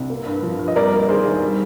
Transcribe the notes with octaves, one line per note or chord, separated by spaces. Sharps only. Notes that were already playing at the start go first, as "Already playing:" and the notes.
Already playing: C2
A#3
G2
F3
G2
D#5
G3 A#4 D5
A#3
D#3 G#4 C5
D#2
G3